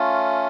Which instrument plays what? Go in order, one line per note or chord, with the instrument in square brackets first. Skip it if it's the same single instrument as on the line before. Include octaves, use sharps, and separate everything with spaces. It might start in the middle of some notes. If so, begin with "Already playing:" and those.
Already playing: [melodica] A3 C#4 F4